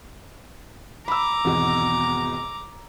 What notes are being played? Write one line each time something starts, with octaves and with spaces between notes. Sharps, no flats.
A#5 B5 D6 E6
G#1 E2 B2